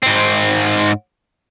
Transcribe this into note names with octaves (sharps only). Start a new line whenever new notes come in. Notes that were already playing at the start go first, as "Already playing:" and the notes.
G#2 C4